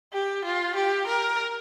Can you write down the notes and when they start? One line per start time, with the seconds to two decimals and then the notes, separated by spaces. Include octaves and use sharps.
0.13 G4
0.45 F4
0.75 G4
1.07 A#4